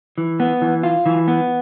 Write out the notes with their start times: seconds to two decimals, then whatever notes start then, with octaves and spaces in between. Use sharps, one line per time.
0.18 E3
0.40 B3
0.62 E3
0.83 F4
1.06 E3
1.28 B3